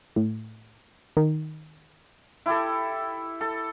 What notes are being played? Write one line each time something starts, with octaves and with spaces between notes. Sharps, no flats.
A2
D#3
E4 G4 A4
A4